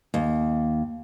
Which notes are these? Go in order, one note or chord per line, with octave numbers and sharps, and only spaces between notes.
D#2